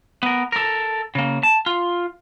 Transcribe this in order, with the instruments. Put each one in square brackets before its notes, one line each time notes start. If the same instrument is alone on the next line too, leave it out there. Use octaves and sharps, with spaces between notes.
[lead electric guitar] B3 A#4
A4 A#4
C#3 A#3
A5
F4